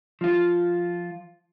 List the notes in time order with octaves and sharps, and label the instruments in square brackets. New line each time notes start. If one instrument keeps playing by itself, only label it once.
[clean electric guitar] F3 F4